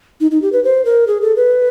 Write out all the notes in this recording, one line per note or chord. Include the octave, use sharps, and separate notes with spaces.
D#4
D#4
G4
B4
C5
A#4
G#4
A4
B4